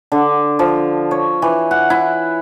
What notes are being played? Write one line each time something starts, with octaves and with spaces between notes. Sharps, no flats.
D3
F3
C#5
E3
F#5
E4